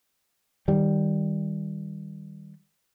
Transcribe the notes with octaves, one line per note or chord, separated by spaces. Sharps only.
D#3 G3